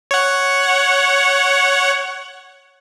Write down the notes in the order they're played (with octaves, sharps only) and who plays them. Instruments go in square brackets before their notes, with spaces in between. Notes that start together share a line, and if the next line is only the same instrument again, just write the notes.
[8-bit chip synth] C#5 F#5